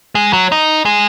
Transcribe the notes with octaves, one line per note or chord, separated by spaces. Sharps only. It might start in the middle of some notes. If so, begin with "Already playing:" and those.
G#3
F#3
D#4
G#3